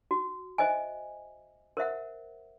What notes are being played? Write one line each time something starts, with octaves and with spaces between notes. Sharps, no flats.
F#4
C5 D#5 E5 G#5
A#4 C5 E5 F#5